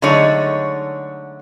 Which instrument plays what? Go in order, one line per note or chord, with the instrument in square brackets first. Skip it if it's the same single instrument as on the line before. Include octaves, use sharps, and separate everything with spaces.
[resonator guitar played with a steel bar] D3 F#3 G#3 A3 D#4 C#5